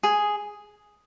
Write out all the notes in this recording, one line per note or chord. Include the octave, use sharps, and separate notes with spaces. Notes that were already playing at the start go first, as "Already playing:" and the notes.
G#4